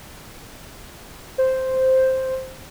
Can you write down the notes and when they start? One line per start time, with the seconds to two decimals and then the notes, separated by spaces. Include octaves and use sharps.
1.38 C5